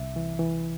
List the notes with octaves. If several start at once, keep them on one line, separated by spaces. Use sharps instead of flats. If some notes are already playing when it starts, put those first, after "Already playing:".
Already playing: C2 E5
E3
E3